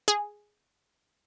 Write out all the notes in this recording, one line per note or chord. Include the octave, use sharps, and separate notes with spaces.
G#4